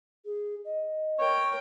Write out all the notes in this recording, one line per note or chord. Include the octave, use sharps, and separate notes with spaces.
G#4
D#5
A#4 C#5 G5